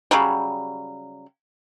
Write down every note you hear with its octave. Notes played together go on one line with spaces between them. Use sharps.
C#3 F#3 G3